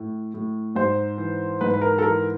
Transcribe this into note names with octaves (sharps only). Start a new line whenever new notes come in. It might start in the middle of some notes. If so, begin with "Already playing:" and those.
Already playing: A2
A2
G#2 C5
E3
G#2 B4
B4
A#4
A4
E3 A#4